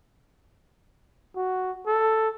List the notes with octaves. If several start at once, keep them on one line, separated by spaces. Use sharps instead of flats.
F#4
A4